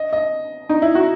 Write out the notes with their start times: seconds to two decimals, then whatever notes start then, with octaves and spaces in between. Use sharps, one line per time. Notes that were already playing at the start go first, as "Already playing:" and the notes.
Already playing: D#5
0.13 D#5
0.69 D#4
0.82 E4
0.95 F#4